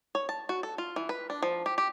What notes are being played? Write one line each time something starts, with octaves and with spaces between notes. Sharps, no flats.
C#5
A5
F#4
A4
F4
E3
B4
D4
F3
G4
G4